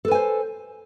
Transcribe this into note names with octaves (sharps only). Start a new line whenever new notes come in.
A4 B4 C5 G#5